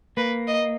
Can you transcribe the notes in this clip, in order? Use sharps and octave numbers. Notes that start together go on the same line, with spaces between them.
A#3 B4
D#5